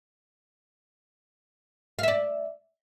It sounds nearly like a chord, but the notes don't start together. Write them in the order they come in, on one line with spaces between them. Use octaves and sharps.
F5 E5 D5